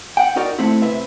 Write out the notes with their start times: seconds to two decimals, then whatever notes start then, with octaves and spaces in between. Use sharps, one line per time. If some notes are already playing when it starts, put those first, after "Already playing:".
0.17 F#5 G5
0.36 D#4 F#4 A#4 D5
0.59 A3 C4 E4
0.82 C3 B4 E5